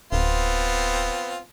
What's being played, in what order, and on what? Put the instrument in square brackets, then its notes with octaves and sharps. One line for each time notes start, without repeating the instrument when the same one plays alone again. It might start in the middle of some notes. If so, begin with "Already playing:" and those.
[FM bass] D1 [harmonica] B3 C4 F4